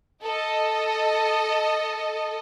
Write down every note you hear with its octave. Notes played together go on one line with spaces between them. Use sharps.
A4 D#5